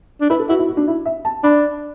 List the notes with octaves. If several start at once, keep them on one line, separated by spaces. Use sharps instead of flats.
D4
E4 B4
A4
E4 F#4
E4
F#4
D4
E4
E5
A5
D4 B5